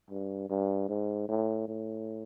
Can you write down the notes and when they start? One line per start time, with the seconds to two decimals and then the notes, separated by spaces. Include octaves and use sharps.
0.10 G2
0.49 G2
0.89 G#2
1.29 A2
1.68 A2